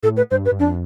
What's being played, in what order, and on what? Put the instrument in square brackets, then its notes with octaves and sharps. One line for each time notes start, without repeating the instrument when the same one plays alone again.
[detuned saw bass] A2 [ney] A4
[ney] B4
[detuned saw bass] G2 [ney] C5
[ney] B4
[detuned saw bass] G2
[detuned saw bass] F2 [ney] D4